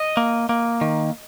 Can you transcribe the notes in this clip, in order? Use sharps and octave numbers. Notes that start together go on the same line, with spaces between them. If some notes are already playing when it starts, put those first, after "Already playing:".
Already playing: D#5
A#3
A#3
D#3